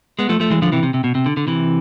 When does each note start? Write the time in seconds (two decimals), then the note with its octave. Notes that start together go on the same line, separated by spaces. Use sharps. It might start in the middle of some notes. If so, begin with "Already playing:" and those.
0.19 G#3 B3
0.29 F3 A3
0.40 F3 A3
0.50 E3 G#3
0.62 D3 F3
0.72 C3 E3
0.83 C3
0.94 C3
1.04 B2
1.15 C3
1.26 D3
1.37 D3
1.47 C3 E3